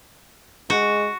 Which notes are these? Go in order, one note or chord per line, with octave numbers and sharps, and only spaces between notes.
G#3 F#4